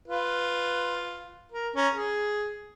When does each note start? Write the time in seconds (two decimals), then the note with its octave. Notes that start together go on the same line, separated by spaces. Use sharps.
0.08 F4 B4
1.52 A#4
1.76 C#4 A#5
1.94 G#4